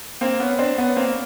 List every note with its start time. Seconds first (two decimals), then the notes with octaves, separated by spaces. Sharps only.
0.21 A#3 C4
0.40 B3 C#4
0.59 C4 D4
0.78 B3 C#4
0.96 A#3 C4